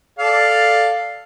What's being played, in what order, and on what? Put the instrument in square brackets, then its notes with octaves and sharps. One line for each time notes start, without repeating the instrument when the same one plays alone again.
[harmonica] A4 D5 F5